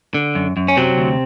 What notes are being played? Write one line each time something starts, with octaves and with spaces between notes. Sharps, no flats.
D3
F#2
F#2
C#4
C3 F#3 C4
D2